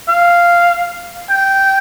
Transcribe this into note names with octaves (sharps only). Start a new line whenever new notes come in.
F5
G5